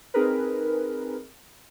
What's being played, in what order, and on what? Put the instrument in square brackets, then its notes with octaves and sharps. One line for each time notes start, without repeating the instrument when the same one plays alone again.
[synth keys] C4 D#4 G#4 A#4 B4